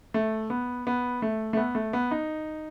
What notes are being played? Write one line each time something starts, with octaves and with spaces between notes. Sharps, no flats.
A3
B3
B3
A3
A3
B3
A3
B3
D#4